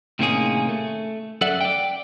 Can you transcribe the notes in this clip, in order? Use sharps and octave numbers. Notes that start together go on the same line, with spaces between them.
A2 C3 D#3 A#3 C#4 G#4
A3
F#2 A4 D5 E5 F#5
D5 G5